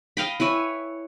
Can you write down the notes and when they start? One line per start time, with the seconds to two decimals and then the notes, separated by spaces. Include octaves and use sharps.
0.17 D#5 F5 G5 B5
0.40 E4 B4 C#5 G#5